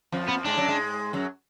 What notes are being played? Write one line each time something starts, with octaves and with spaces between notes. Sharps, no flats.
F2 F3
B3
G#2 G#3 D4
F#2 F#3
G#2 G#3
F#2 F#3